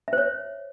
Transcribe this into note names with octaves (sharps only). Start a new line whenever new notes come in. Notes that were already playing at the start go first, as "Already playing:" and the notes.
C5 C#5 E5